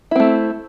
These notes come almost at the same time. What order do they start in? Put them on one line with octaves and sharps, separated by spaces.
E4 C4 A3